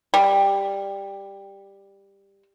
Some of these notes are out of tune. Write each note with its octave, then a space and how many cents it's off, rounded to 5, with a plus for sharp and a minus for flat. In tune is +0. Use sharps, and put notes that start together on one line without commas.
G3 +10